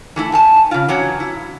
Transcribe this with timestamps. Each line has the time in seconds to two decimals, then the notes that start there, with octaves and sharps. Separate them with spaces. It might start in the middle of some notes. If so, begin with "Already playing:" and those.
0.16 E3 A3 E4
0.32 E2 G#5 A5
0.71 C#3 F4
0.89 E3 F#3 C#4
1.20 E4